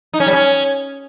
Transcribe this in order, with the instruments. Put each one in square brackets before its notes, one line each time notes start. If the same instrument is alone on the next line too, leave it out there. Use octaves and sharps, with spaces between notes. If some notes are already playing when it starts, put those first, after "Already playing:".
[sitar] D#4
C#4
G3
C#4